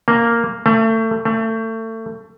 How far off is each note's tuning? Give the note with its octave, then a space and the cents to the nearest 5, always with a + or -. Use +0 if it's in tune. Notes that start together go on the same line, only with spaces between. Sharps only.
A#3 -5
A3 +30
A3 +30